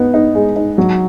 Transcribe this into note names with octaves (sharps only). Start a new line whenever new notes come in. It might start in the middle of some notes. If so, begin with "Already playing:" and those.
Already playing: B3 D#4
D#4
G#3
D#4
F#3